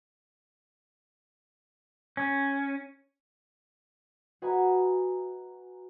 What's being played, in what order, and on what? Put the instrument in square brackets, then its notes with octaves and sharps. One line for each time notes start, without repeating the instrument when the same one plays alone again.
[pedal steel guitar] C#4
[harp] F#4 B4 D#5 G#5 A#5